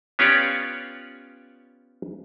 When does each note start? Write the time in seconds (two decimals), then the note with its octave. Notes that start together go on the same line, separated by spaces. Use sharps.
0.19 B3 C#4 F4 G4 C#5 D5